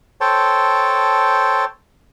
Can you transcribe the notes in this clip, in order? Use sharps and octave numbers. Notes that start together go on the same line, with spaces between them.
A4 C5 C#5 G5 A5